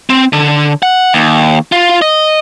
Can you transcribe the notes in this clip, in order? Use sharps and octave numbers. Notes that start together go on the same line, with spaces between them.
C4
D3
F#5
D#2
F4
D#5